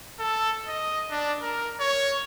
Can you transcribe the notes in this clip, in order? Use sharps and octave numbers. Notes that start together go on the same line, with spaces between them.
A4
D#5
D4
A#4
C#5